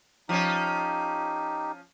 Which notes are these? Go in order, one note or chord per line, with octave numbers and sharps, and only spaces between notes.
F3 C#4 D#4 G4